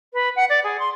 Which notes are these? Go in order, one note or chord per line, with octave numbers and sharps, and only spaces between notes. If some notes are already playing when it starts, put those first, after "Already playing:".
B4
F#5
D5
G#4
C6